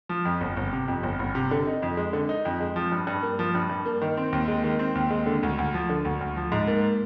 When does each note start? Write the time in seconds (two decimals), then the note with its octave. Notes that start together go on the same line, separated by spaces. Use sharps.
0.09 F3
0.25 F2
0.41 G1
0.57 G1
0.72 C3
0.88 F2
1.03 G1
1.19 G1
1.35 C3
1.51 D3
1.67 D#4
1.83 F2
1.97 G#3
2.13 D3
2.29 D#4
2.45 F2
2.60 G#3
2.76 F3
2.92 G2
3.07 G2
3.23 A#3
3.39 F3
3.55 G2
3.69 G2
3.85 A#3
4.01 D#3
4.17 C4
4.32 D#2
4.48 G#3
4.64 D#3
4.79 C4
4.95 D#2
5.11 G#3
5.26 D3
5.43 D2
5.58 D2
5.74 F3
5.89 D3
6.05 D2
6.21 D2
6.36 F3
6.52 G#2
6.67 A#3